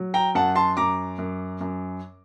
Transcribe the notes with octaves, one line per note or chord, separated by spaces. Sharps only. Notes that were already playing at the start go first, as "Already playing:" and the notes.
Already playing: F#3
G5 A#5
F#2 F#5 A5
A5 C6
F#2 A#5 D6
F#2
F#2